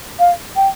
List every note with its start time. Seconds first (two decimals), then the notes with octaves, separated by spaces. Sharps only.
0.19 F5
0.56 G5